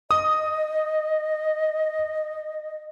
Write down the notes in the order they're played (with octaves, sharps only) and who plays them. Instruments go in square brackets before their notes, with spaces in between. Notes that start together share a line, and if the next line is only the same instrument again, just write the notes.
[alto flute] D#5 [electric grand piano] D#6